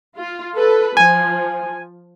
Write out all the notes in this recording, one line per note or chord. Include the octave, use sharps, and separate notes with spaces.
F4
A4 B4
F3 G#5